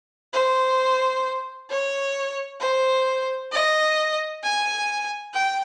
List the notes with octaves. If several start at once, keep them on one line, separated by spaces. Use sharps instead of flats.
C5
C#5
C5
D#5
G#5
G5